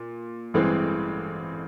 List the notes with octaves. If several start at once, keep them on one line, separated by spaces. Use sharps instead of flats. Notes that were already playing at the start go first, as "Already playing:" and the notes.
Already playing: A#2
A1 G2 E3 G#3 C4